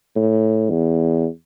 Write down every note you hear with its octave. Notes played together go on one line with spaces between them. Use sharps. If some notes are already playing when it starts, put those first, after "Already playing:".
A2
E2